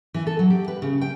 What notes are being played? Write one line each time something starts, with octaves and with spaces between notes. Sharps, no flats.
E3
A4
F#3
G4
B4
C#3
G5